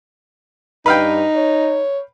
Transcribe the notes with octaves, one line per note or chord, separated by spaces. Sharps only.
G2 D#4 B4 F5 G5
C#5